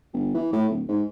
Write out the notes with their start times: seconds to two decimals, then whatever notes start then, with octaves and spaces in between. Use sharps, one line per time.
0.13 G1
0.34 E3
0.53 A2
0.69 D1
0.88 G#2